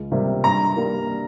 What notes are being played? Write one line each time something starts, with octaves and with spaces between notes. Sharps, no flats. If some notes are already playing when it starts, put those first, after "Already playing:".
Already playing: C#2
C3 G3 A#3
G2 A#5
G3 A#3